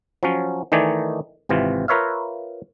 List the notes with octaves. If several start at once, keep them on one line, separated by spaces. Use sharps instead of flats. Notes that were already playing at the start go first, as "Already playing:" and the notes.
F3 F#3 C#4
D#3 E3 A3 D#4 D5 G#5
G#1 C3 E3 F4
F4 A#4 B4 C#5 E5 F5